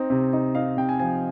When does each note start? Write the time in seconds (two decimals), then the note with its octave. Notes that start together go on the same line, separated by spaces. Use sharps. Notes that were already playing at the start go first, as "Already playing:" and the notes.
Already playing: C4 D#4
0.10 C3
0.33 D#4
0.55 D#4 F5
0.77 C3 G5
0.89 G#5
0.99 F3 G#5